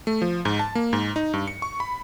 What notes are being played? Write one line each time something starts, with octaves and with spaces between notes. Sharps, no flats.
A3
F3
G#2
A5
A#3
G#2
D#4
G2
C#7
C#6
B5